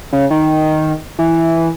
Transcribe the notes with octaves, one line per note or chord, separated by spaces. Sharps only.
C#3
D#3
E3